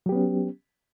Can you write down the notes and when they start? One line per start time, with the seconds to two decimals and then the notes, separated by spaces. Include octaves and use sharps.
0.06 F#3
0.09 G4
0.12 B3
0.15 C#4